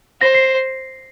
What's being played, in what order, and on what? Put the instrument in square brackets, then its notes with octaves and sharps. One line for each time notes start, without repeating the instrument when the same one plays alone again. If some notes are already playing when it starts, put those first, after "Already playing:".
[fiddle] C5 [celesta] A#6
[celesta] C7